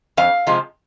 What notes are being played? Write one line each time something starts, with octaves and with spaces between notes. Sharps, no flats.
F2 F5
C3 F3 G#3